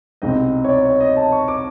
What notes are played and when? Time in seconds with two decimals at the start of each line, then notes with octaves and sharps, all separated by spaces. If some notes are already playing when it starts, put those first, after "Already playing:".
0.22 C2 B2 G#3 C4 D#4 D#5
0.64 C#5
0.69 D5
0.85 C#5
1.00 D#5
1.17 A5
1.32 C#6
1.48 D6